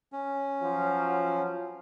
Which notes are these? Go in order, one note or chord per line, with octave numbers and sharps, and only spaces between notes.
C#4
F3 F#3